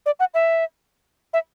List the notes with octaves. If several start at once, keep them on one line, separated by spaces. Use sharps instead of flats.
D5
F#5
E5
E5